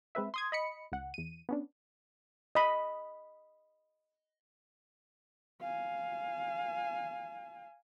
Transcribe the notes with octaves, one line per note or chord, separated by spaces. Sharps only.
G#3 C4 B4 E5
C6 D#6 G#6
D#5 B5 C#7
C#2 F#5
E2 D#7
B3 C#4 D4
D#5 B5
F5 G#5